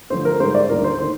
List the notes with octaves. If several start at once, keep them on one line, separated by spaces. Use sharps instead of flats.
D2 D3 F3 C5
A#4
G#2 G3 C5
D5
D#2 D3 G3 A#4
C5
D#3 C5